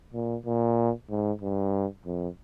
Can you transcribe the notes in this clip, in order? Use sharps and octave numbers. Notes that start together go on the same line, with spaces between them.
A#2
A#2
G#2
G2
F2